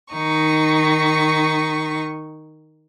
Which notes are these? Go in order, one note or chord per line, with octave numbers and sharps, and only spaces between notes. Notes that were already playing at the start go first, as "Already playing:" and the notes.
D#3 D#4 C#6